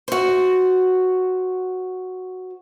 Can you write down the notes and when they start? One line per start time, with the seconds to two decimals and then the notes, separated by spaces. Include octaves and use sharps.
0.08 F#4 C5